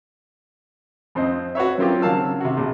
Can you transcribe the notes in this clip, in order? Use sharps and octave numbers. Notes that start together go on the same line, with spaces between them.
F2 C4 C5 D#5
F#4 B4 C#5 E5
F#3 A#3 C4 F4 G4
C#3 F#3 A#3 F5 A5 E6
C3 F#4
A#1